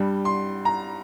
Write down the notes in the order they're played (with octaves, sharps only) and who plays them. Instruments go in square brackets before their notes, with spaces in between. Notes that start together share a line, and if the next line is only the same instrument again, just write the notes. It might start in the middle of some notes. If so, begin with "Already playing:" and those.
Already playing: [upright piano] G2 G3
C6
A#5